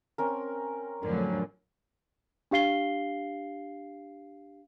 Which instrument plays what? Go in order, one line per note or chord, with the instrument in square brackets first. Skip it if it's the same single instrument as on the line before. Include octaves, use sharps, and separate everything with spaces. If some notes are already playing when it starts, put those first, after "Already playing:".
[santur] C4 C#4 A#4
[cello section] F2 A2 D3 [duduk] F#3 [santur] A#4
[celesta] D4 G4 F5 C7 G7